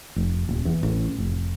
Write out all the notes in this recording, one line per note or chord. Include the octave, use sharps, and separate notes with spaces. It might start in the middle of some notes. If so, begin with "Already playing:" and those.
F1
D#1
E2
A1
F1